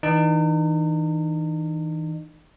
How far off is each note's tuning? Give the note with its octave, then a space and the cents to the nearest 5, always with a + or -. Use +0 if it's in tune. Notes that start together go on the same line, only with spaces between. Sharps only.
E3 -40 D#4 -40